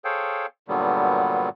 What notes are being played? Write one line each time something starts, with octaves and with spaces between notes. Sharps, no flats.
G#4 A4 C5 C#5 F5 G5
G2 A#2 D3 F#3 G3 B3